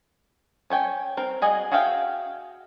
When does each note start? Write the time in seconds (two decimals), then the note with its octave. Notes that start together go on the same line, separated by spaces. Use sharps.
0.70 C#4 C#5 G5 G#5
1.17 C4 A#4
1.42 F#4 G#4 D#5 G#5
1.72 F#4 G#4 E5 F5 G5